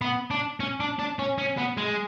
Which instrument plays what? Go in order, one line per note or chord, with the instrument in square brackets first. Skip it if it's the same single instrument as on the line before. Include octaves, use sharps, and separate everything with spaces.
[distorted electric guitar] B3
D4
C#4
D4
D4
C#4
C#4
B3
G#3